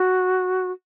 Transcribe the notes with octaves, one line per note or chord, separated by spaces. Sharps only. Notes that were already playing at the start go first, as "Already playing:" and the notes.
Already playing: F#4